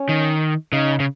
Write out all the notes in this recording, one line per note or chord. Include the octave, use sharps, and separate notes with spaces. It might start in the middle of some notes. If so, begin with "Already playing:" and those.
Already playing: C#4
D#3
C#3 D#4
C#3